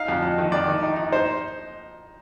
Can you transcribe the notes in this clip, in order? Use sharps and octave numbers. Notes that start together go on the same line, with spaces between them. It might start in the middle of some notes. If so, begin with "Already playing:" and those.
Already playing: D#4 F5
F2
F2
D#3
F2 D5
D#3
D#4
D#4
D#4 C5